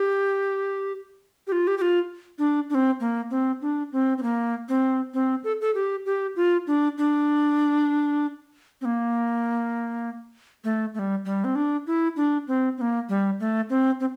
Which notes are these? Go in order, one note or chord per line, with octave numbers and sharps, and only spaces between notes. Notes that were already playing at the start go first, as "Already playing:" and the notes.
Already playing: G4
G4
F4
G4
G4
F4
D4
D4
C4
A#3
C4
D4
C4
C4
A#3
C4
C4
A4
A4
G4
G4
F4
D4
D4
C4
A#3
A3
A3
G3
G3
C4
D4
E4
D4
C4
C4
A#3
G3
A3
C4
C4